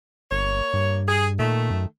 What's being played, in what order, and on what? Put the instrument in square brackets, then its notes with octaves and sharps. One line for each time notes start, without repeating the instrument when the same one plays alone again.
[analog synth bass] G1 [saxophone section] A#3 C#5
[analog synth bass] G2
[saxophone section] G#4
[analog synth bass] A#2 [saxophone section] D#3 A3
[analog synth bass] F#2